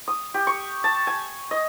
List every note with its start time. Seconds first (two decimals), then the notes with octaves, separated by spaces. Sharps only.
0.08 D#6
0.34 G4
0.47 C#6
0.84 A5
1.07 G#5
1.51 D#5